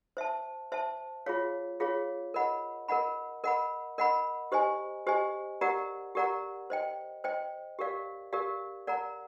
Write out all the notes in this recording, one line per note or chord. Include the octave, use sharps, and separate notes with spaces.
C5 E5 A5
C5 E5 A5
F4 G#4 C#5 F5
F4 G#4 C#5 F5
A#4 D#5 F#5 B5
A#4 D#5 F#5 B5
A#4 D#5 F#5 B5
A#4 D#5 F#5 B5
G4 C5 D#5 G#5
G4 C5 D#5 G#5
G4 A#4 D5 F#5 A#5
G4 A#4 D5 F#5 A#5
C5 D#5 G5
C5 D#5 G5
G4 A#4 D5 F5
G4 A#4 D5 F5
A#4 D5 F#5 A#5